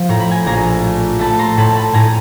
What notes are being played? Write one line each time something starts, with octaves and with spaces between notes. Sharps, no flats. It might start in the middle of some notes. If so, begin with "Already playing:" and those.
Already playing: F3
A2 A#5
B5
G#5 A#5
A#1 G#5 A#5
A3
A3 A5 B5
A#5 C6
A2 A5 B5
A5 B5
A2 G#5 A#5